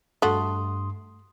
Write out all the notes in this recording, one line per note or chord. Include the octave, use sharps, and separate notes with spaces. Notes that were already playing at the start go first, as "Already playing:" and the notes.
G2 A3 F#4 C6 D#6